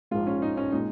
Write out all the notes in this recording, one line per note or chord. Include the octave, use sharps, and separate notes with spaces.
A#1 G#2 G#3 F4
C#4
D#4
C#4
A#2 G#3 D#4